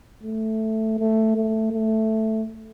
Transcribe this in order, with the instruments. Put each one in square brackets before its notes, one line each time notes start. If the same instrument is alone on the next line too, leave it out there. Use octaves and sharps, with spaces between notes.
[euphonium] A3
A3
A3
A3